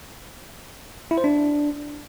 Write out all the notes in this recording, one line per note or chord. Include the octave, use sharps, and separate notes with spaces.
E4
C5
D4